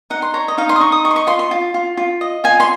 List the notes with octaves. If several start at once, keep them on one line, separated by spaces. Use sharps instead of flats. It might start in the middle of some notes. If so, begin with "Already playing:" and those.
D#4 F#5
C6
C#5 A#5
D#5
D#4 F5
C6
D#6
D#4 C#6
D#6
D#5 C#6
C6
C#6
F4 C6
C6
F4
F4
F4
D#5
F4 G#5
C6